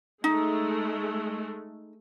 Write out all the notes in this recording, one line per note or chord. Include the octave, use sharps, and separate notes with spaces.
G#3 A3 D#4